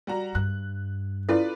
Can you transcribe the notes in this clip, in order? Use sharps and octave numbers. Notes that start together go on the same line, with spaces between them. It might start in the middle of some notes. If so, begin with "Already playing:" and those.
G3 F#4 A#5
G2 F#6
C#4 E4 F4 A4 B4 D5